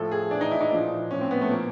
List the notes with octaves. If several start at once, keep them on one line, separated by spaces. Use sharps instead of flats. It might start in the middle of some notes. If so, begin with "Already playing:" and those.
Already playing: A2 F3 A4
G#4
A2 E3 D4
D#4
E4
D#4
A#2 F3 D4
A2 F3 C#4
C4
B3
A3
A#2 F3 A#3